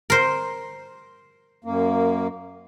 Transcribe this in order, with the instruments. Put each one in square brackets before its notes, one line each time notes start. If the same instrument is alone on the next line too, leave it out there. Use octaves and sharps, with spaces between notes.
[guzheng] A#4 C5
[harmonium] F#2 A#3